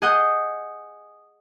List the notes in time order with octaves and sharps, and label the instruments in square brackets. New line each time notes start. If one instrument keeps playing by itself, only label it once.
[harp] G#4 D#5 F#5 D#6 G6